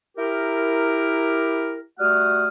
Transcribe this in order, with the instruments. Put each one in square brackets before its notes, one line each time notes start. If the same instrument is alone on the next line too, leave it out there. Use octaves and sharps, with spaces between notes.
[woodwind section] E4 G4 A#4
G3 A3 F#4 F#5 D#6 F6